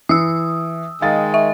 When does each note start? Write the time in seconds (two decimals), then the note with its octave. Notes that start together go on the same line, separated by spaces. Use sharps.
0.09 E3 D#6 E6
1.02 D#3 G#3 F5 A6
1.34 E5